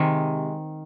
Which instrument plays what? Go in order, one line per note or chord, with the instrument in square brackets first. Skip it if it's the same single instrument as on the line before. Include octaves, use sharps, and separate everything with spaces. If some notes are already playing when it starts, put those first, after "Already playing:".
Already playing: [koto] C3 D#3 G#3